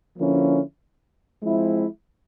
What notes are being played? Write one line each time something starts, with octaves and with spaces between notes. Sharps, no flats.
D3 F3 A#3 C#4 E4
F3 G#3 C4 E4